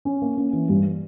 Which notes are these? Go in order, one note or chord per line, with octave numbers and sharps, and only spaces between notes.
C#4
A#3
C#4
E3
G2